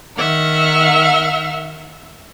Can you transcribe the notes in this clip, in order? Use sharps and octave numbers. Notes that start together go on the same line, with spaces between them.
D#3 E5 F#5 F6